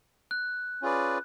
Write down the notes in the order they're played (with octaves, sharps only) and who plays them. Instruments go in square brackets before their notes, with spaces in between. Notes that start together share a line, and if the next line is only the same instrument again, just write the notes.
[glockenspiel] F#6
[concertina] C#4 F4 G#4 B4 D5